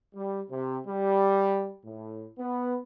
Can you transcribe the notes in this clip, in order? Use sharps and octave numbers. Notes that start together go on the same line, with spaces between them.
G3
C3
G3
A2
B3